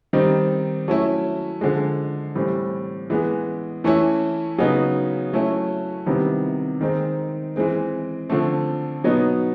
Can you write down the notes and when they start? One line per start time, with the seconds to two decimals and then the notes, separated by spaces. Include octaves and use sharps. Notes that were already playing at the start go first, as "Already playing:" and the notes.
0.13 D#3 G3 C4 D#4
0.88 F#3 A3 C#4 E4
1.61 D3 F3 G#3
2.35 A2 E3 G3 C4
3.10 E3 G#3 B3
3.84 E3 A3 C#4 E4
4.58 C#3 F#3 B3 D#4
5.33 F#3 A3 C#4 E4
6.06 C3 D#3 G3 B3 E4
6.81 D#3 G#3 C4 D#4
7.56 E3 G#3 C4
8.29 D3 F3 A3 C4
9.04 B2 F#3 B3 D#4